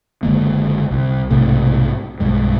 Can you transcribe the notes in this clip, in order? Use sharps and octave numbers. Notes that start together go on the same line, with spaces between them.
F#1 D3 G#3 A#3
C2
B1 G#2 C3 A3
B1 E2 G2 G#3